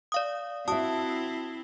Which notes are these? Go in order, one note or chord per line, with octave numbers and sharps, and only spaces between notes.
D5 F5 D#6
C4 E4 F#4 E5 A5 D#6